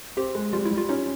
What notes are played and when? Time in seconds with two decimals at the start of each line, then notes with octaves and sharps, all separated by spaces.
0.17 C4 G4
0.35 G#3
0.53 G3 F4
0.65 E4
0.71 G3
0.78 F4
0.89 C#4 D#4